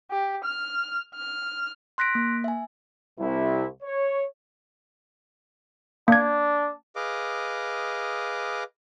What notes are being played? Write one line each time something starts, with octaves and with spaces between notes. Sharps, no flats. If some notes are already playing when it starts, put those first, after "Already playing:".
G4
F6
F6
C6 F#6 A#6 B6 D7
A#3
E5 G#5
C2 E4
C#5
A#3 D4 G#6
G#4 B4 D#5 F5 D6